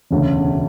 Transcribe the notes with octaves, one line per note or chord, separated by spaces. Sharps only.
E1 D2 C#3